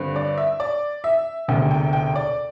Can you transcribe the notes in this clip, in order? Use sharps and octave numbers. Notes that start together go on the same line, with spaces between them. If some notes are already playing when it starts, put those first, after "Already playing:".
Already playing: G2 D3 C4
D5
E5
D5
E5
E1 D2 C3 G5
G5
G5
D5